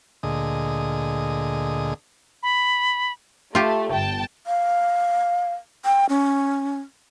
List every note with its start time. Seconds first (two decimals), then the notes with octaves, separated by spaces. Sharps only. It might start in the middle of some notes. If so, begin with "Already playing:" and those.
0.23 D2 A#2 D3 G#4 D#5 D#6
2.43 B5
3.55 A3 F4 G4
3.91 G1 G5 A5
4.46 F5
5.85 G5
6.09 C#4